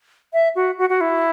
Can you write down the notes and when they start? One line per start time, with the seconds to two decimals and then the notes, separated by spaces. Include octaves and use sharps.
0.33 E5
0.55 F#4
0.78 F#4
0.89 F#4
1.01 E4